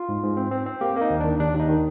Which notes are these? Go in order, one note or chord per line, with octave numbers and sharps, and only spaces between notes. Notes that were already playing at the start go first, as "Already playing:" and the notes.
Already playing: F4
G#2
G#2
C4
C4
C4
A#3 G4
A#3 D#4
D#2
D#3 D4
D#2 D4
D#2
D#4
D#3